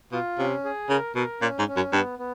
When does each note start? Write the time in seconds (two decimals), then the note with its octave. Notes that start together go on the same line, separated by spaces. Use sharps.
0.12 B2 F4
0.38 C3 C#4
0.65 G#4
0.89 C#3 A#4
1.15 B2 A#4
1.41 A#2 C#4
1.59 G#2
1.68 C#4
1.76 F#2
1.92 G2 B3
2.19 B3